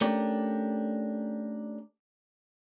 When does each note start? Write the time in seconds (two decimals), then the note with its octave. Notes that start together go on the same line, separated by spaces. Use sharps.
0.01 A3 C#4 D4 G4 A#4 D5